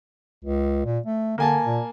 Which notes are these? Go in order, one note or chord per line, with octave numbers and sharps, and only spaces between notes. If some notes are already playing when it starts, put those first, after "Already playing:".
C#2
A#2
A3
D3 A#3 G#5 A5
A#2